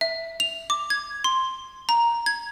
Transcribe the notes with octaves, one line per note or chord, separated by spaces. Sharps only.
E5
F7
D6
G#6
C6
A#5
G#6